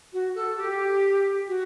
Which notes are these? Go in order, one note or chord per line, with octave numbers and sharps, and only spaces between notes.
F#4
A4
G4
F#4